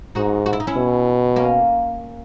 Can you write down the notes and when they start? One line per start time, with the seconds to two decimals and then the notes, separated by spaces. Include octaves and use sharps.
0.15 G#2 D#4 F#4
0.46 F#4
0.53 E4
0.60 D#4
0.67 C#4 E4
0.77 B2
1.36 A#3 C#4